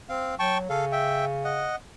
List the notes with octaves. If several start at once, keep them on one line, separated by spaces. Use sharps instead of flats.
C4 F5
F#3 G5 A5 C#6
C#3 A4 F5
E5 G5
D#5 F#5